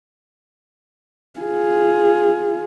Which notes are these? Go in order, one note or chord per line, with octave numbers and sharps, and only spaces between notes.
F4 G#4